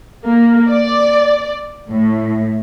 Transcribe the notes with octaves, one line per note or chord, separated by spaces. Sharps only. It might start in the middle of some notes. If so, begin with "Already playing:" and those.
A#3
D5
A2